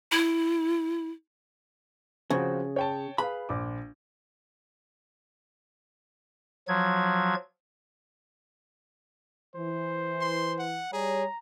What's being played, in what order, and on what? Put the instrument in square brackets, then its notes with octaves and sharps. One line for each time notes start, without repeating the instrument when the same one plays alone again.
[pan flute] E4
[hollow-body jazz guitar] C#3 [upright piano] F3 C4 F#4
[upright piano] C#5 G5 A5
[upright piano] G#4 B4 F5 [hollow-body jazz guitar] B5
[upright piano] A#1 D6
[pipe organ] F3 F#3 G#6
[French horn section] E3 [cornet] C5
[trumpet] C6
F#5
[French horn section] G3 C#5 [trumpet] G#4 [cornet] A#5